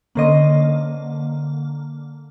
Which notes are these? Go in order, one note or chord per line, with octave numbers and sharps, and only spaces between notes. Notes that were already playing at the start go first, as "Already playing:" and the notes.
D3 A#3 C#4 C5 D#5